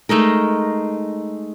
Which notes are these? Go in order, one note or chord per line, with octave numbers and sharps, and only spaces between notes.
G#3 A3 D#4 A#4